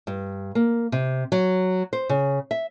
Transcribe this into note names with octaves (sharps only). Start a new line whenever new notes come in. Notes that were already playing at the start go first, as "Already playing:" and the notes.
G2
A#3
C3
F#3
C5
C#3
E5